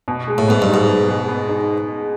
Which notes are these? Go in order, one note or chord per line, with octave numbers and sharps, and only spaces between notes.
B2
G#3
A2
G#2 B3
G2
D#4
G#2
B2
G#3
B3
D#4